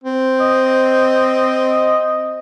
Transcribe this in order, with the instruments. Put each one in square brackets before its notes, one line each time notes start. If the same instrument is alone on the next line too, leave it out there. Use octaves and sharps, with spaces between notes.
[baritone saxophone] C4
[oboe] D#5